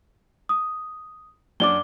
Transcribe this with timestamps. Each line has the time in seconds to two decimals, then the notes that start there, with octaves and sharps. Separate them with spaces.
0.49 D#6
1.60 F#2 D4 D6 G7